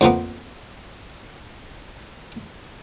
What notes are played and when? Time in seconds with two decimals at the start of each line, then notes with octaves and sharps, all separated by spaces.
0.01 F2 F3 A#3 B3